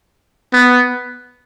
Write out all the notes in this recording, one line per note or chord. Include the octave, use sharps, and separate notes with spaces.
B3